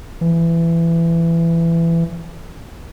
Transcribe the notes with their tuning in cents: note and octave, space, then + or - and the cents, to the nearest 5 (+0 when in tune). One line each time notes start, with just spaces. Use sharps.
E3 +20